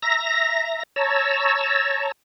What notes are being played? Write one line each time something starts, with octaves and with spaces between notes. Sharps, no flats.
E5 A#5 A#6
C#5 A5 A#5 E6